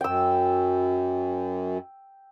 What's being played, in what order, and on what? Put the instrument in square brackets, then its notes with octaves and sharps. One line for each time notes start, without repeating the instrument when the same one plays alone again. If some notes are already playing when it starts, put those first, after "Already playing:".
[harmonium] F#2 [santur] G5 E6